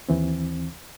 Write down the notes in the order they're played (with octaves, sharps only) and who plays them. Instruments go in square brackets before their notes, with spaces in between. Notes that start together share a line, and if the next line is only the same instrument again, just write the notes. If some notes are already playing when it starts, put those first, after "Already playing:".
[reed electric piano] D#2 E3 C4